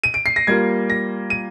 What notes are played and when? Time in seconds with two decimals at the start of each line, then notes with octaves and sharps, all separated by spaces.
0.04 D#7
0.14 D7
0.26 C7
0.36 A#6
0.47 G3 A#3 F4 G#6
0.90 A#6
1.30 D#7